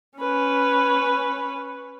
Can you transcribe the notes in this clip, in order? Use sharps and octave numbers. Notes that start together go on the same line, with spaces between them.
C#4 B4